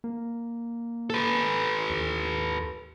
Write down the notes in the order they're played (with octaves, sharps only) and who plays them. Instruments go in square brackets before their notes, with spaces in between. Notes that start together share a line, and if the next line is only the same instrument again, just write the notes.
[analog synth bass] A#3
[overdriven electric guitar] A4 B4
[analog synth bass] D#2